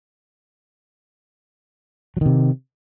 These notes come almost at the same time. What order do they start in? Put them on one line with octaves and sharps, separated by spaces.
F#3 D#3 C3